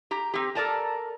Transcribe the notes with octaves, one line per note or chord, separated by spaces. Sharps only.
G4 A#5
C4 G4
A4 A#4 D5 A5 A#5